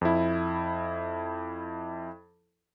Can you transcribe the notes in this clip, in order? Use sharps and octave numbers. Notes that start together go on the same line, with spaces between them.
F2 E4